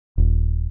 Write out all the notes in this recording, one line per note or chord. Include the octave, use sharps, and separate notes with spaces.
D#1